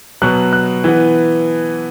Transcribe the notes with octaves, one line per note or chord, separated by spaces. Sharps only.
B2 F#3 B3 F#6
F#6
E3 B3